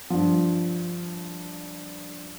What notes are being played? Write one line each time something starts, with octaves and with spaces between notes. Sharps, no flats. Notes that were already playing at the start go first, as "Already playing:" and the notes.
G2 F3